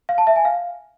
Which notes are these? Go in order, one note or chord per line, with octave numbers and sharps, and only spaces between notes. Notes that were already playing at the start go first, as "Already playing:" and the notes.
F5
A5
E5
G#5
F5